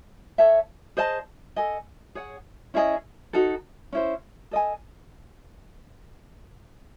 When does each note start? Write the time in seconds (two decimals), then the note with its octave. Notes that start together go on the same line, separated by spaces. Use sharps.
0.38 A4 C#5 E5 A5
0.97 G#4 C5 D#5 A5
1.56 A4 D#5 G#5
2.15 G#4 C#5 F#5
2.74 C#4 E4 G#4 D#5
3.33 D#4 F#4 A4
3.93 C#4 E4 C5
4.51 A4 D#5 G#5